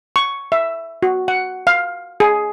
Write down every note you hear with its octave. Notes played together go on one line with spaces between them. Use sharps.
C#6
E5
F#4
F#5
F5
G#4